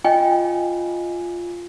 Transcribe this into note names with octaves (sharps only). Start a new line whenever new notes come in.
F4 D#5 G5 G#5